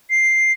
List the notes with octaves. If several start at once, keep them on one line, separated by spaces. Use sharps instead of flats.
C7